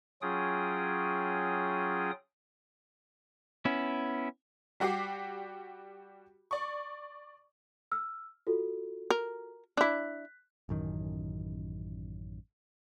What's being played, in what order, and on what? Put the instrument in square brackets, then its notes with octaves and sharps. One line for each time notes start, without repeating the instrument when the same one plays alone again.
[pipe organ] F#3 C#4 F4 G#4 G5 D#6
[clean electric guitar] B3 C#4 E4
[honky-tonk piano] G3 F#4 G4 D6 C7
D5 C#6
[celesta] E6 F6
F4 F#4 A4
[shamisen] A#4
[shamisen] D4 E4 [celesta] F#6 B6
[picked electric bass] A1 F#2 D#3